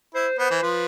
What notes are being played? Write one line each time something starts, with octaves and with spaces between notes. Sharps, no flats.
E4 C5
B3 C5
E3
F3 B4